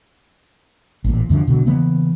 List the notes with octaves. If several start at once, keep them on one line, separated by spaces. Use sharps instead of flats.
A1 A#2
F#2 D3 E3 F3
B2 D3 F#3
C#3 E3 A#3 B3